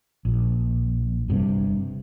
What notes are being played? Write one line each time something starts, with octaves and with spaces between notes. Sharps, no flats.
A#1
G1 G2 C3